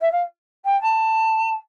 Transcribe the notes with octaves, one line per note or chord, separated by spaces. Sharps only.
E5
F5
G5
A5